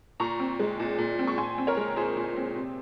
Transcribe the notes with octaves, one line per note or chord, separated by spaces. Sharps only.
A#2 A#5 C#6
C4
G#3
A#2
A#2
C4
C#6
A#2 G#5 C6
C4
A#4 C#5
G#3
A#2 G#4 C5
A#2
C4
C3